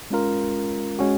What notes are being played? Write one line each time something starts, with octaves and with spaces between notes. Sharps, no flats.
G#3 C#4 F4 A#4
G#3 C#4 F#4